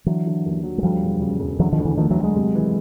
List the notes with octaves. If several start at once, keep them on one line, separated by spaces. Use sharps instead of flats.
D3 E3 F#3
D3
D#2
F#3
G#3
D2 F3 G3
E1
C#3
E1
D3 E3 F#3
D#3 F3
D2
D3 E3
D#3 F3 A3
E3 F#3
D3
F#3 G#3
C3
E3